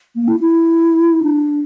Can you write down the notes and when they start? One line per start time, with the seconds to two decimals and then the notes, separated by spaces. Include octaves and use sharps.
0.16 A#3
0.28 E4
0.40 E4
1.23 D4